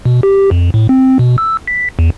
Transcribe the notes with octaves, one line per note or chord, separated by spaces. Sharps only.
B2
G4
F2
A2
C4
B2
E6
B6
E2